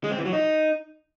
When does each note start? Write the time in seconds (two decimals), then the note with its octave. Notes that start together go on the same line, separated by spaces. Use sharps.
0.04 G#3
0.11 C4
0.18 E3
0.25 F#3
0.33 D#4